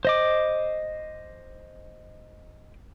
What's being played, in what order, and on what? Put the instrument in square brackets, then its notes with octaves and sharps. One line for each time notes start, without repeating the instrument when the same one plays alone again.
[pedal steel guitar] C5 D#5 D6